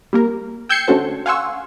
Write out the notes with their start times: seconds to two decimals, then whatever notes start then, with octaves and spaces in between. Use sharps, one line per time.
0.13 G3 A#3 A#4
0.69 G5 E6 G6 G#6 C7 C#7
0.88 D3 A3 C#4 F#4 A4 C5
1.26 F5 F#5 G#5 C6 C#6 E6